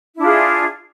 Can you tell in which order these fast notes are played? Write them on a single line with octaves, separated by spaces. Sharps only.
E4 D4 F4 G#4